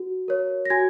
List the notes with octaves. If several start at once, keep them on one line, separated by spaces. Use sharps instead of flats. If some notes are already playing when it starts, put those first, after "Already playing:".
Already playing: F#4
A#4 C#5
A#6
F#4 G#5 G#6